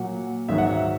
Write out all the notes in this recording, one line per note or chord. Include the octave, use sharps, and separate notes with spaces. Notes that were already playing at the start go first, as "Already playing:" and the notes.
Already playing: A#2 F#3 F#5
G#2 D#3 F#3 E5
F#5
E5